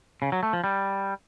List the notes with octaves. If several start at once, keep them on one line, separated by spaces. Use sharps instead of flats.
C#3
F#3
A3
F3
G3